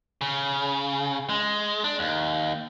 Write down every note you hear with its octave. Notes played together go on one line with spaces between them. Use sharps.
C#3
G#3
D4
D#2